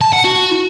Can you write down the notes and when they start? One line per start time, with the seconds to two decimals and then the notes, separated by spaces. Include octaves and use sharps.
0.01 A5
0.13 F#5
0.24 F#4